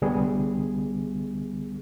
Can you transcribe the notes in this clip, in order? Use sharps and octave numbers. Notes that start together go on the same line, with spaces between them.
C2 D3 G3 B3 G#4